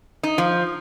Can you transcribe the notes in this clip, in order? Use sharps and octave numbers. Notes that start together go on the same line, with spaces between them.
D#4
F3